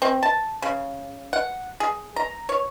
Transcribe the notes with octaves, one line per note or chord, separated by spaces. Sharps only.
C4
A5
C#3
F#5
G#4
A#5
C#5